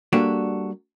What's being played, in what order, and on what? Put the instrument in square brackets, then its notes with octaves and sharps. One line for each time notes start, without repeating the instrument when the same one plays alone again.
[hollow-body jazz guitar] G3 A#3 D4 F#4 G4 A4